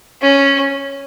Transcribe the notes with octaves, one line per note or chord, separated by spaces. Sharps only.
C#4